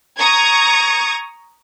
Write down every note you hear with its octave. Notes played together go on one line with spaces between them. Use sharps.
A#5 C#6 D#6 G#6